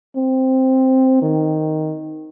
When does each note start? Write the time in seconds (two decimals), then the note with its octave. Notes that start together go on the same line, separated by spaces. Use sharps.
0.16 C4
1.22 D#3